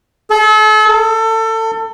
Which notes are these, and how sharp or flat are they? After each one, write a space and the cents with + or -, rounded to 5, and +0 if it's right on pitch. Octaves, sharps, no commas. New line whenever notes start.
A4 -40
A4 +25